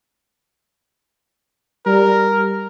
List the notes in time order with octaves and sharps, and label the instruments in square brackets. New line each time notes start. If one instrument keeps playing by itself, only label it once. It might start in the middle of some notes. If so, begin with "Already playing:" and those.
[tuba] G3 [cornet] A#4